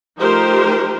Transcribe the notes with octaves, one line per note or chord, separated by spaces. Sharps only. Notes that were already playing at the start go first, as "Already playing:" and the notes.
F3 A3 D#4 G4 A#4 C5